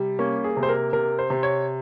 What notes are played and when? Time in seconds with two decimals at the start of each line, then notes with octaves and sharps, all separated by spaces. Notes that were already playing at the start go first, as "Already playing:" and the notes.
Already playing: C3 G3
0.19 A#3 C#4
0.44 G#4
0.57 C3
0.63 C5
0.69 A#4
0.93 C3 A#4
1.19 C5
1.30 C3
1.43 C#5